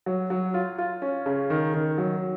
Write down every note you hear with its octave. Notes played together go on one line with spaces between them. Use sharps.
F#3
F#3
F4
F4
C#4
C#3
D#3
D#3
F#3